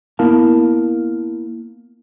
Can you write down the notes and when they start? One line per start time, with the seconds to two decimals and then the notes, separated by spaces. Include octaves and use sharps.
0.19 A#3 B3 E4 A#4 F5 A5